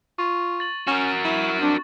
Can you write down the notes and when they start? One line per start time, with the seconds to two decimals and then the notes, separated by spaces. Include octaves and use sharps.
0.18 F4 C#6
0.60 A6 F#7
0.87 C#4 F#4 A#4
1.24 E4
1.61 C4 D4